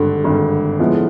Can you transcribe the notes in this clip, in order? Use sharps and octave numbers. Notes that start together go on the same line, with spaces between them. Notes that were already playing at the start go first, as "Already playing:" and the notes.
Already playing: G#1 G2 D3
G#1 G2 D3
A2 F3 G#3 B3 E4